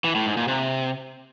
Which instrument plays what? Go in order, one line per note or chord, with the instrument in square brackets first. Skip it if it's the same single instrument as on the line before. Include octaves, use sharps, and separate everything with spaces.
[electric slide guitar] E3
A2
G#2
A#2
C3